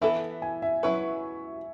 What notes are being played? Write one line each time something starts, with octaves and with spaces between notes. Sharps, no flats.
E3 B3 E4 A4 E5
G#5
E5
F#3 C#4 E4 B4 C#6